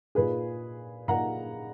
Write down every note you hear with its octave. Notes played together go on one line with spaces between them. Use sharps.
A#2 A#3 D#4 G#4 B4
A#2 A#3 D#4 F#5 A#5